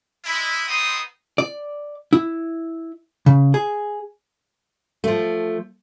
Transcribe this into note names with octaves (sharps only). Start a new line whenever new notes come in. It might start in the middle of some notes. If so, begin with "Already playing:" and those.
G#3 E4
B3 C4 D#4 C5 D#6
D5
E4
C#3
G#4
F3 A3